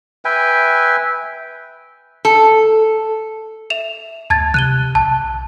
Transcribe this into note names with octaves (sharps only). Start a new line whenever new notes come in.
B4 E5 G5 G#5
A4
E5 E7 F7
D2 A5 G#6 A6
C3 F#6 D#7 G7
B1 A5